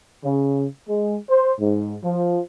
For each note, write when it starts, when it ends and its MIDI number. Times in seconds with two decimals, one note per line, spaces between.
0.24 0.64 49
0.88 1.15 56
1.29 1.53 72
1.59 1.96 44
2.03 2.40 53